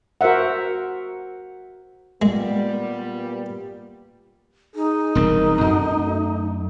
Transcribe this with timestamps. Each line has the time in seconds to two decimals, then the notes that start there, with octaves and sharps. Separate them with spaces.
0.21 F#4 A#4 C5 E5 F#5
2.22 A#2 G3 G#3 B3
4.75 D#4 G#4
5.15 E1 C2 C4 A#4
5.61 F#2 A#2 F#4 A4
5.92 D3 A3